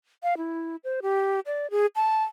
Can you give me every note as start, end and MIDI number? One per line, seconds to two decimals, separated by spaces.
0.23 0.37 77
0.37 0.76 64
0.84 1.00 72
1.02 1.40 67
1.46 1.70 74
1.71 1.86 68
1.96 2.24 81